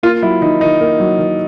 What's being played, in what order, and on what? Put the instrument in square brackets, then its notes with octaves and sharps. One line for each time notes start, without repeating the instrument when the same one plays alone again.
[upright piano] A#3 [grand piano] F4
[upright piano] F#3 [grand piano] E4
[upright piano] D#3 [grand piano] D#4
[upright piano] D#3 [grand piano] D#4
[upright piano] A#3
F#3
D#3